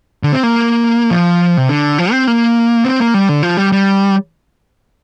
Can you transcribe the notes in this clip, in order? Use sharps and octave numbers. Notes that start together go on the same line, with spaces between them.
D3
C4
A#3
F3
C3
D3
F3
C4
A#3
C4
A#3
G3
D3
F3
G3
G3